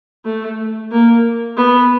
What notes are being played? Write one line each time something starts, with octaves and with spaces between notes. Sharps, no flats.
A3
A#3
B3